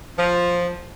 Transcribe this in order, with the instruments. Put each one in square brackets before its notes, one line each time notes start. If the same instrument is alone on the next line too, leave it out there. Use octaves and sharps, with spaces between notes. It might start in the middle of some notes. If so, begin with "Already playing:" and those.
[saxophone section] F3